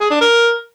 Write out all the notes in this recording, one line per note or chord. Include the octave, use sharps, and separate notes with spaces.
G#4
D4
A#4